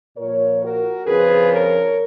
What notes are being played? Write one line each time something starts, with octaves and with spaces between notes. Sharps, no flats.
A#2 F3 A#4 C#5
F#4 A#4
F2 C#3 F3 G#4 B4
A#4 C#5